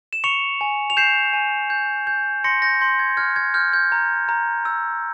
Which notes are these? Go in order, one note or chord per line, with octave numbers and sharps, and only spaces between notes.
E7
C#6 C#7 F7
G#5
F7
G6 C7 E7
G#5
G6
G6
C6 A#6 C#7
G6 A#6
C6 G6
G#6
F6 G#6
G#6
F6 G6
G6
A#5
A#5
E6